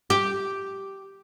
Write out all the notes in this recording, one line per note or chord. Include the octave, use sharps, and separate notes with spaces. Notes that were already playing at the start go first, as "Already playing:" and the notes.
G4